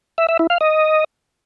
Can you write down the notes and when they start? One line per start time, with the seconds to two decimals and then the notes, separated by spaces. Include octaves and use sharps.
0.18 E5
0.29 E5
0.39 E4
0.50 F5
0.61 D#5